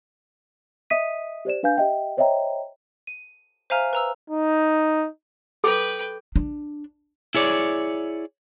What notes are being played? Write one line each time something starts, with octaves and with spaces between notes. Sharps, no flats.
D#5 E5 D#6 B6 D#7
G4 C5 D5 E7
D4 B4 F5 G#5 G6
G4 D#5 E5 G5
C5 C#5 D#5 E5 G5 A#5
D#7
C5 E5 F5 G#5 A#5 F6
B4 A#5 E6
D#4
A4 B4 G5 D6
D4
E4 G#4 C#5 D5